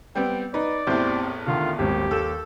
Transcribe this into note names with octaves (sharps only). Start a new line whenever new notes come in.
G3 B3 C4 G5
D#4 B4 D5
A1 E2 C4 G4 C5
D3 D#3 F4
D#1 G#1 D#2 G4
D#2 A4 G6 E7